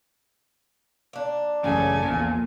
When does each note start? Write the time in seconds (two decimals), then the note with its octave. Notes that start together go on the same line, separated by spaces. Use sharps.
1.13 A#3 D4
1.64 A1 F#2 C#3 A4 G#5
2.04 A#1 E2 A#2